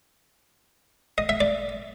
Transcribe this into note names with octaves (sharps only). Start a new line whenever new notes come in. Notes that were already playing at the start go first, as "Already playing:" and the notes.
D#5
E5
D5